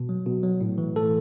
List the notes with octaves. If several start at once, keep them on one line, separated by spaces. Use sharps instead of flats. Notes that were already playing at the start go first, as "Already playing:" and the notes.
Already playing: B2
F#3
B2
F#3
A2
E3
A2 A4